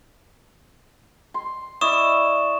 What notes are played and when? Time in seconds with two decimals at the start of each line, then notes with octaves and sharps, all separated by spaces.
1.34 C6
1.81 E4 D5 D#5 C#6 D#6 E7